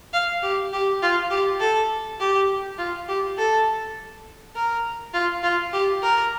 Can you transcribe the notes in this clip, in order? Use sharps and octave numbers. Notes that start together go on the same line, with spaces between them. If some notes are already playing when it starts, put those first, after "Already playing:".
F5
G4
G4
F4
G4
A4
G4
F4
G4
A4
A#4
F4
F4
G4
A#4